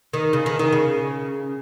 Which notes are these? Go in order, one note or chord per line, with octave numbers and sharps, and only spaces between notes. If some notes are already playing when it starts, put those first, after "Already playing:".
D#3
C#3
D#3
D#3
C#3